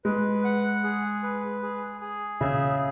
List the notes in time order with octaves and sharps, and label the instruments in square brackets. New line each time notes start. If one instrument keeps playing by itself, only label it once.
[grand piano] G#3 [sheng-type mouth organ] B4
[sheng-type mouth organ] F#5
G#4
B4
G#4
G#4
[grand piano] C#3 [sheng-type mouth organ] E5